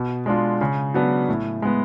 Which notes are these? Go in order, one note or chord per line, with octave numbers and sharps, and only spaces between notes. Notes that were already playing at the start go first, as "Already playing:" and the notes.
Already playing: B2
G#3 D4 F4
C#3
F#3 B3 D4
A2
G#3 B3